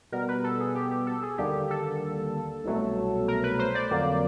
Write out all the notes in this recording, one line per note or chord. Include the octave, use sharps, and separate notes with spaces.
B2 G3 B3 A#4
B4
A4
G#4
G4
G4
A4
G#4
D#2 D3 G3 A#3 G4
A4
C2 B2 F#3 A3
A#4
B4
C5
D5
F2 D3 F#3 A#3